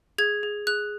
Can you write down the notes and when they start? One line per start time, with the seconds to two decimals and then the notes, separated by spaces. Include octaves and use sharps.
0.18 G#4 G#6
0.43 G#4
0.67 G#4 F#6